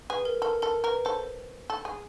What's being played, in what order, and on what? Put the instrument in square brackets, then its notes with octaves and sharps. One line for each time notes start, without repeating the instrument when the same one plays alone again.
[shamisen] G#4 [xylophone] B4
[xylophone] A#4
[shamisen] A4 [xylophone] A#4
[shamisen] A4 [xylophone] A#4
[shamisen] A#4 [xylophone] B4
[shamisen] A4 [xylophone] C5
[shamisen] A4
G#4